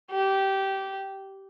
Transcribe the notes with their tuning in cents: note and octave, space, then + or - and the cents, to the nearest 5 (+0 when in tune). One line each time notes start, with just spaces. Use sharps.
G4 -15